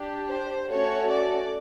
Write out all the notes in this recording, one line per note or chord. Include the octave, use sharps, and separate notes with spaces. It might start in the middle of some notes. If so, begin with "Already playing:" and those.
Already playing: D4 G4
C5
A3 C#4 F#4 A4 C#5
D5